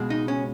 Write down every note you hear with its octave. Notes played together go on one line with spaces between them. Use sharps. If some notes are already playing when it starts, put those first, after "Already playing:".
Already playing: C#2 B2 G#3
D#4
C#4